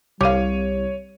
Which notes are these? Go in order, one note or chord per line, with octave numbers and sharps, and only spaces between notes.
C2 G3 G4 C#5 F5 D#7